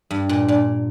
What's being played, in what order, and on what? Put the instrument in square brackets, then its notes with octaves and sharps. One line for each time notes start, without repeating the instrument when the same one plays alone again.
[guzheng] G2
A#2
[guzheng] A#2 [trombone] D4